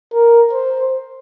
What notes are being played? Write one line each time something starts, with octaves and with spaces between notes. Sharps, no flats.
A#4
C5